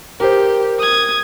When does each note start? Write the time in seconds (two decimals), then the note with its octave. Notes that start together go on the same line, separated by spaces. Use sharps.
0.20 G4 A#4 C5
0.80 D#6 G#6